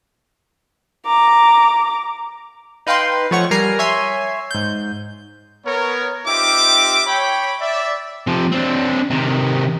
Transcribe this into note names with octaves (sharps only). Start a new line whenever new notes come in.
A#5 D6
D#4 B4 F5 G5 C6
F3 A3 C#5 F#5 C#6
G3 A#4 G#5 A#5 F6 C7
C#5 E5 G#5 C6
G#2 G6
B3 A#4 C#5
C4 D#4 F4 G4 E5 D6
C#5 G5 B5
D5 E5
C3 F3
C4 D4
C3 D#3